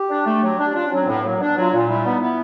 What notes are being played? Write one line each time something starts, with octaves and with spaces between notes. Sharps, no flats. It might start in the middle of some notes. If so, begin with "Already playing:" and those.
Already playing: G4
D4
A3
F#3
D4
D4 F4
F#3 C#4
C4
A2 B3
F#3 A#3
B3
D4
B3
F#3 F4
A#2 F4
G3 E4
B3 D#4
B3 E4